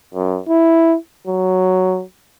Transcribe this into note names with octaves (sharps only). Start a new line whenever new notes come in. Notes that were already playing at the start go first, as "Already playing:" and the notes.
F#2
E4
F#3